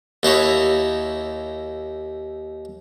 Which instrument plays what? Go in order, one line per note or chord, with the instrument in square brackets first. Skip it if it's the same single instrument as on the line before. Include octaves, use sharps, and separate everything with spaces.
[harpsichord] D#2 D#4 E4 C#5